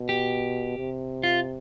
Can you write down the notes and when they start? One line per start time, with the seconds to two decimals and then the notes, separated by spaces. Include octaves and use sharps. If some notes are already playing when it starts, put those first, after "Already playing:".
Already playing: B2
0.09 G4
0.78 C3
1.23 F4